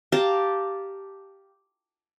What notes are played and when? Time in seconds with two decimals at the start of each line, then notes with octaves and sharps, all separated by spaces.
0.12 G4 F5 A5 A#5